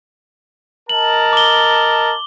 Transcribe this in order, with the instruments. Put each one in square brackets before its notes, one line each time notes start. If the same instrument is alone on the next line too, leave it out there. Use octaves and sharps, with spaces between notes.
[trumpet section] A#4 D#5 A5 [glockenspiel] F#7
[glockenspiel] D6 G7